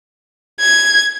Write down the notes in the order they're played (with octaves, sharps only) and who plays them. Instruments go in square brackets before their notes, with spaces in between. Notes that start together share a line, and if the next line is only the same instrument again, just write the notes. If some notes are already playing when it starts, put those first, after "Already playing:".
[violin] G#6